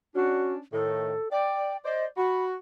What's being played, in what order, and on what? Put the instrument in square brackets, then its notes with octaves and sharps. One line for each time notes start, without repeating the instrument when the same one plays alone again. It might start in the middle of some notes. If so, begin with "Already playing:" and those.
[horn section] C#4 D4 [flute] F#4
[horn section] A2 D#3 [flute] A4
[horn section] D5 [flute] G5
[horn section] C5 D5 [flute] D#5
[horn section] F#4 [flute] B5